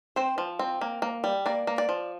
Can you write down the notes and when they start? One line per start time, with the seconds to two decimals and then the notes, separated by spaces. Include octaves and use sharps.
0.16 C4 C5
0.38 F3
0.59 C4
0.81 A#3
1.02 A#3
1.24 G3
1.46 A#3 D5
1.67 A#3
1.78 D5
1.89 F3